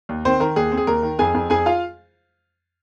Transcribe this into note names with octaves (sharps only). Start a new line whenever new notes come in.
D#2
D#3 C4 C5
D#3 A#4
D#2 G#4
C4
G#4
D#2 A#4
D#3
F2 G#4 G#5
F2
F2 G#4 G#5
F4 F5